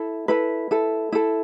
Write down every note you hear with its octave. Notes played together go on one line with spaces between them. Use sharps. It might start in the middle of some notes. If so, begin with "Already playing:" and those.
Already playing: E4 A4
E4 A4 B4
E4 A4
E4 A4